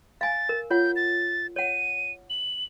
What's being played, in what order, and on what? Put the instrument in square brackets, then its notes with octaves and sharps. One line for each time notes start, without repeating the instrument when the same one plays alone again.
[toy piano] F5 G#5 [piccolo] A6
[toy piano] A#4
[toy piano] F4 C#5 F#5 [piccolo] G6
[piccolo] A6
[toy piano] C#5 F#5 [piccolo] D#7
[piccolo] F#7